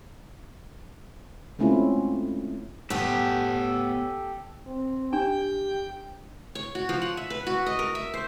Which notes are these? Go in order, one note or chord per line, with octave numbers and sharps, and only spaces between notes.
G#3 A3 C4 C#4 E4 F4
A2 B3 G4 A4
C4
D4 G4 G5
C#5
F#4
F3
F#5
E5
B4
F#4
D#5
A#4
E5
C5